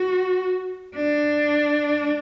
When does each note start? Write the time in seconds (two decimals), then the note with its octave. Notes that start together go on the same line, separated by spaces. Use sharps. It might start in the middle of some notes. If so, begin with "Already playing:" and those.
Already playing: F#4
0.96 D4